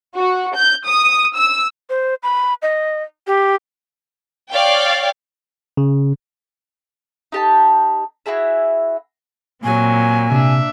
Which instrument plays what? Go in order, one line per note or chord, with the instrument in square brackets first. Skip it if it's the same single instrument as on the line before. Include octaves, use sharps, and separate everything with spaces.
[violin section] F#4
G6
D#6
E6
[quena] C5
B5
D#5
G4
[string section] C#5 D5 F5 G5
[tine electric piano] C#3
[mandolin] D#4 G4 A5
E4 F#4 G#4 E5
[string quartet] A#2 [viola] F#3 C4 [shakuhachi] G#5
[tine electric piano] C3 [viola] D4 E5